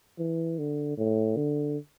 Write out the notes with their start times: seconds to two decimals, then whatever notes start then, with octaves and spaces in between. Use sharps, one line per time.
0.19 E3
0.59 D3
0.98 A2
1.36 D3